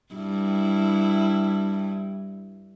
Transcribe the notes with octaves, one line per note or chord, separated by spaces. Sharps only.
G2 E4